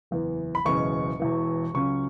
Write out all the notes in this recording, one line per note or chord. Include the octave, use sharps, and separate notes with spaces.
F#1 E2 E3 B3
B5
F#1 E2 B2 G#3 C#4 C#6
E1 E2 E3
C#2 C#3 F#3 C#4 C#6